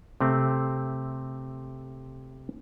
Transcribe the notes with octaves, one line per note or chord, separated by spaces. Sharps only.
C3 A3 C4